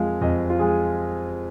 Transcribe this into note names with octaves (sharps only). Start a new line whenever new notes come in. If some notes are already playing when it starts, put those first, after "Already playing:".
Already playing: F2 F3 G#3 F5
F2 D#5
F4
F3 G#3 G#4